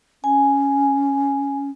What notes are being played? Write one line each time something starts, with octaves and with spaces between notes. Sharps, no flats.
C#4 G#5